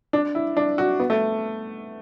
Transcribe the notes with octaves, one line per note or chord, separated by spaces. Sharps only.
D4
E4
D4
F#4
B3
A3